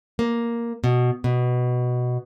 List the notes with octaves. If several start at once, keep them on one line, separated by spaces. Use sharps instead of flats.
A#3
B2
B2